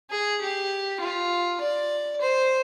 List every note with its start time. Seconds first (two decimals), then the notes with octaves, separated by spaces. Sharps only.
0.10 G#4
0.41 G4
1.01 F4
1.60 D5
2.21 C5